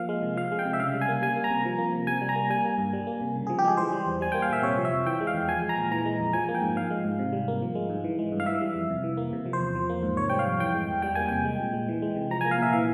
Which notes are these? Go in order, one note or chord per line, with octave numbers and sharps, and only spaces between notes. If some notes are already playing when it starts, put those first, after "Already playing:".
Already playing: F3 A#3 F5
G#3
C3
F3 F5
G#3
G5
C3
E5
C#3 F5
G3
G#5
A#3
G3 G#5
A#3
A#5
C3
F3
A#3
C3
C3 G#5
G3
A#5
A#3
G3 G#5
A#3
G2
G3
A#3
C3
C#3
F3 G#4
G4
G#3 G#4
E3 C5
G3
E2
G3 G#5
A#3 G5
F5
A#2 E5
C3 C#5
F3
E5
F2
E3 G5
G#3
F5
E2
F3 G#5
G#3
A#5
A#2
E3 A#5
G#3
F2
F3 G#5
A#3
G5
G#2
F3 F5
G#3
G#2
C3
G3
A#3
F3
G#3
G#2
E3
G#3
G2
F5
E3 E5
G3
F2
C3
E3
A#3
C3
F3
C5
E2
F3
A#3
G#2
C3 C#5
G3 G5
F5
F2
E3 G5
G#3
E2
G3 G5
A#3 G#5
C3 G5
G#3
A#2
G#3
E3
G#3
C3
F3 A#5
A#3 G#5
F5
A#2 E5
E3 F5